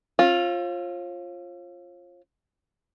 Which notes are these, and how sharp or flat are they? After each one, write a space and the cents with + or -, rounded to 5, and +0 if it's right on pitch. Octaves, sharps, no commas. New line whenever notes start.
C#4 -45 F4 +0